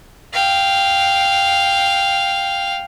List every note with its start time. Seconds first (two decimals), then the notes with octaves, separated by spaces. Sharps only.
0.33 F5 G5